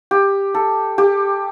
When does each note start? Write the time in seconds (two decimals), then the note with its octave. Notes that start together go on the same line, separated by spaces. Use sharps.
0.11 G4
0.54 A4
0.98 G4